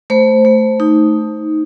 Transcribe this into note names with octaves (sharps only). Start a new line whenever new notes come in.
A3 C5
A3
D#4